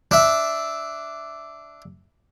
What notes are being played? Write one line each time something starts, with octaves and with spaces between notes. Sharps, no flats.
D4 E5